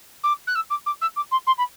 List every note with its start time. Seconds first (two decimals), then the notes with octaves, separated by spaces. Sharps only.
0.23 D6
0.47 F#6
0.55 E6
0.70 D6
0.86 D6
1.01 E6
1.16 D6
1.31 C6
1.47 C6
1.58 B5